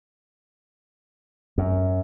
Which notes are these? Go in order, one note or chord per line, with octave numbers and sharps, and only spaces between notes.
F#2